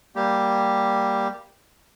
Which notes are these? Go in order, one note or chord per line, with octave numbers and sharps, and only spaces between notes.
G3 A#3 G4